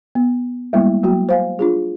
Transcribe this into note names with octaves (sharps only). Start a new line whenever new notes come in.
B3
G3 G#3 A#3 B3 E4
F#3 A#3 F#4 G5
C5 F5 G#5
D4 F4 G#4